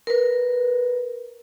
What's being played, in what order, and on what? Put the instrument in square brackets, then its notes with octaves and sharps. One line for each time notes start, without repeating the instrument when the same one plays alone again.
[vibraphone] A#4 B4